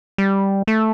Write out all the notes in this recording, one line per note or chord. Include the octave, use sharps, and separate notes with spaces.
G3
A3